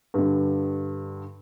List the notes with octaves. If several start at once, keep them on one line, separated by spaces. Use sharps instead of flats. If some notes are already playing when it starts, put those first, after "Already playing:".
G2 D3